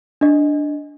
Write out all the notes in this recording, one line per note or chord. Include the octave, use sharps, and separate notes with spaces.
D4 D#5